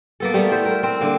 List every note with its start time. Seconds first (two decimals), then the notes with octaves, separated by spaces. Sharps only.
0.20 A#3 B3 A4
0.34 G3 A3 B3
0.51 E4 C5
0.65 A#4
0.83 C4
1.01 D3 A#3